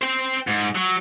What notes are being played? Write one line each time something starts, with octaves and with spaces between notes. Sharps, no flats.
C5 G5
G#2
F#3